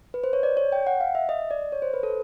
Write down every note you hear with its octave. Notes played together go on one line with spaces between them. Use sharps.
B4
C5
C#5
D5
C#5
G5
F#5
F5
E5
D#5
D5
C#5
C5
B4
A4